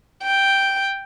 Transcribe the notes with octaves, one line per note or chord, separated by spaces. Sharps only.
G5